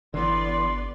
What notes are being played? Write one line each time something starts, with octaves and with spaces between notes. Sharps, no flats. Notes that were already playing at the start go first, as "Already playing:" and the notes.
G1 D3 E3 G3 B3 B4 D5 C6